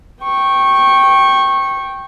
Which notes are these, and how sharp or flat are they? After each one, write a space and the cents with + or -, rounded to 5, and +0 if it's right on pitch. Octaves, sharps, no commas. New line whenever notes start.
G5 -10 C#6 -20